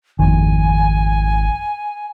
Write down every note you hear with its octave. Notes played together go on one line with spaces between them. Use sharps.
G#1 F2 D#3 G#5